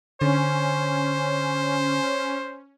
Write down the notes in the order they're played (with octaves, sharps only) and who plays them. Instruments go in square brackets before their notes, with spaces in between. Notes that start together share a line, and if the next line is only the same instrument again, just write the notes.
[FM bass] D3 [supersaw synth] C#4 [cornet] C5